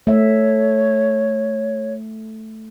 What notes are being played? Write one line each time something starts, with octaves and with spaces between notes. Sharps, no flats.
A3 C#5 E5